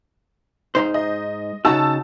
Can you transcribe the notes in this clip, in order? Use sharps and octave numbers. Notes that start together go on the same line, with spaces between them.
G#2 D#4 C5
D#5
C#3 D#4 F#4 A5 E6